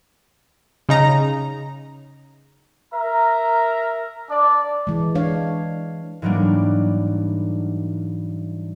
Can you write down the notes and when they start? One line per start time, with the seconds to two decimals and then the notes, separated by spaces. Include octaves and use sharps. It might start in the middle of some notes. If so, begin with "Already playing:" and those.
0.89 C#3 D#4 A#5
2.94 A#4 E5 A#5
4.29 D4 D5 D6
4.87 E3 G#3
5.15 G#3 D4 C#5 F5
6.22 G#2 E3 F#3 G3 A#3 D4